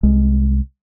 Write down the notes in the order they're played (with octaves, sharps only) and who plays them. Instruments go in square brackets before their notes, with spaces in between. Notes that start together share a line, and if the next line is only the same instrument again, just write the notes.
[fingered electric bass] C2 G#3